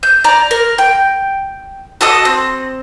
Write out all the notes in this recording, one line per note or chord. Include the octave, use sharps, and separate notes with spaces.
G6
D5 A#5
A#4
G5
F#4 A4 D#5 D#6
C4